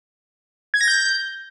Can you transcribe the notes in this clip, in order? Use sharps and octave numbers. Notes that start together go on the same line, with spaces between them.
G#6
A#6
G6